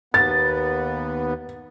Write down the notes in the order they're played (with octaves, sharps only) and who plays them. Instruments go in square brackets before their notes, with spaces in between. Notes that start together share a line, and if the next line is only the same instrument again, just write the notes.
[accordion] D#2 B3 [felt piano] A6